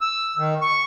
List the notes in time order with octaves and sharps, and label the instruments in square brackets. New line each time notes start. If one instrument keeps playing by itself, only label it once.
[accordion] E6
D#3
C#6